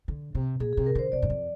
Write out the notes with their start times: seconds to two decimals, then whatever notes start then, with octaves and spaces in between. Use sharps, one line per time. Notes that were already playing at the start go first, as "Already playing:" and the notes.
0.08 D3
0.35 C3
0.60 A#2 G#4
0.73 G#4
0.77 C3
0.86 A#4
0.95 D3 C5
1.12 C3 D5
1.22 G2
1.30 F2